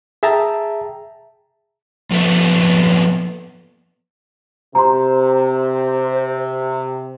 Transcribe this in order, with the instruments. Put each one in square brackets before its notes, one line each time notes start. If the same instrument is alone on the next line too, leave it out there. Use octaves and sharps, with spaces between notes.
[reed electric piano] G#4 E5 G5 A5 A#5
[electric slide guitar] F3 A#3 B3 A4 E5
[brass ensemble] C3 [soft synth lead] C5 [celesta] A#5 C6